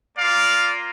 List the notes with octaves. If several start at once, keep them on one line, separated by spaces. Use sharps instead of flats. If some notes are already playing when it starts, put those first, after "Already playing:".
A#3 F4 D5 F5